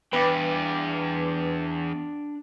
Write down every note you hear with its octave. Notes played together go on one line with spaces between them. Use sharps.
E2 D4 B4 G5 D6